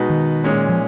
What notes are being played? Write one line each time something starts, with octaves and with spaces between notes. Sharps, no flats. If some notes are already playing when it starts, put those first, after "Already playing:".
Already playing: B2 G#3 D#4 F#4 B4
D#3
A#2 G#3 C#4 G#4
F3